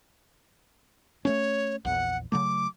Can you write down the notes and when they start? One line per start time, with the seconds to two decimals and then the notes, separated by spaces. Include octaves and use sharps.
1.25 A3 A#3 C#4 C#5
1.85 A#1 E2 F#5
2.32 C#3 F#3 A3 D6